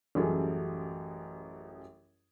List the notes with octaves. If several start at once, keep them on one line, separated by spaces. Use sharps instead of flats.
A1 F#2 G3 C#4 G#4 A4